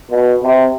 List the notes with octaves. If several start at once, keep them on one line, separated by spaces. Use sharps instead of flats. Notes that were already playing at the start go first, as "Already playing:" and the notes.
B2
C3